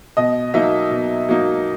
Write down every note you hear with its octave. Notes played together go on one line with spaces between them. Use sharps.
B2 D#5
F#3 A#3 D#4 E5
B2
F#3 A#3 D#4